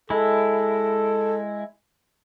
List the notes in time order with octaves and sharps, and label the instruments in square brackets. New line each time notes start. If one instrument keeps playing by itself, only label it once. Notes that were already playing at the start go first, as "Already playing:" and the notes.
[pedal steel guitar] G#3 E4 [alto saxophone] A4